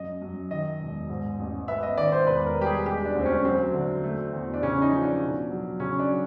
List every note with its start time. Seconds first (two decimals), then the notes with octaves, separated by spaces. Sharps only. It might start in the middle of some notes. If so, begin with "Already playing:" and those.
Already playing: F#2 D#5
0.22 F#2
0.51 D#3 D#5
0.80 E1
1.10 G#2
1.39 A1
1.68 B3 E5
1.83 D#5
1.98 D#3 D5
2.12 C5
2.27 E1 B4
2.46 A#4
2.57 G3 G4
2.66 G#4
2.86 G#3 G4
3.05 D4
3.15 D2 C4
3.25 C#4
3.45 F#3 C4
3.74 D3
4.04 A3
4.33 E2
4.54 D4
4.62 C#3 C#4
4.82 D#4
4.92 F3
5.01 D4
5.21 B2
5.50 F#3
5.80 C#3 C#4
5.99 D4
6.09 F#3